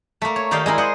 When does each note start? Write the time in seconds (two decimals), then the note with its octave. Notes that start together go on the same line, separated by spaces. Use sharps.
0.22 A3 A#3
0.36 C#5
0.51 D#3 A#3 G4 D5 F5
0.66 G#3 E4 A#4
0.78 C5 D#5 F#5